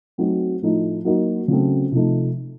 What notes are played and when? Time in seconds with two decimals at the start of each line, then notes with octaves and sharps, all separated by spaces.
0.18 F#3 A3 C4 D#4 F#4
0.62 A2 F3 A3 D#4
1.05 F#3 A#3 D#4 F#4
1.48 C#3 F#3 A3 C4
1.91 C3 F3 A3 D#4